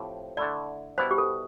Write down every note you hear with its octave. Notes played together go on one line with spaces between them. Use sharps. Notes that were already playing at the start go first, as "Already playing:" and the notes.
Already playing: A2 F3 C4 G4
D3 A3 E4 A4 D5
B2 G3 B3 E4 C5
G4
A4